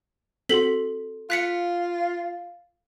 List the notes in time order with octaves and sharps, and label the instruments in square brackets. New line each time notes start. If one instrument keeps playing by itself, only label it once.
[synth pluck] C4 F#4 C6 [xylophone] A4 B6 F#7
[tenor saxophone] F4 [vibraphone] F5 [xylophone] F#6 B6 C#7